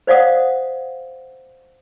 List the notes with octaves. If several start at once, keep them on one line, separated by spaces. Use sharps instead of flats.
C5 D5 F5 F#5 D#6